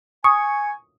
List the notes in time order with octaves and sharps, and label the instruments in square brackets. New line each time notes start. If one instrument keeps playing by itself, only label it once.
[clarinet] G#5 [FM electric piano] C#6 [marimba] D#6